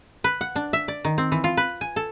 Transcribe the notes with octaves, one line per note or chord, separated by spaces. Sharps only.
B4
F#5
D4
E5
D5
D#3
C4
E3
F4
B4
G#5
A4